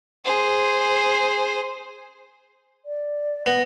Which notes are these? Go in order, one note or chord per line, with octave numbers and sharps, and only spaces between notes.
G#4 C5
D5
B3 A#6